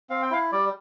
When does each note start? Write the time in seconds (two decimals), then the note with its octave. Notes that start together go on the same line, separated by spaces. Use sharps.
0.10 C4 F5
0.22 G5
0.31 E4 F5
0.52 G3 D5